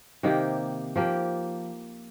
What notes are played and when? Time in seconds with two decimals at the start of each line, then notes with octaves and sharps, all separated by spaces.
0.23 C3 D#3 A#3 G4
0.96 F3 A#3 G4